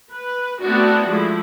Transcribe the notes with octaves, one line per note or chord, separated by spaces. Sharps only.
B4
A3 B3 C4 D4 E4 F#4
F3 G#3 A3 E4